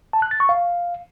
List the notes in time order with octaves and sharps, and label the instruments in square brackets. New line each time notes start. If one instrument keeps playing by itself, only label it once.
[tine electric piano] A5
F#6
A6
C#6
F5